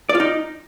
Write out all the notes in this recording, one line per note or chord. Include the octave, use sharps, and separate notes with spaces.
D5
F4
D#4